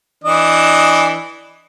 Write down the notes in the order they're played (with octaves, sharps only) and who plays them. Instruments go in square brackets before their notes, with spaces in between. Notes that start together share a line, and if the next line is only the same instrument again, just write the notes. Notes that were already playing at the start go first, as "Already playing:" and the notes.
[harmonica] E3 D4 D#5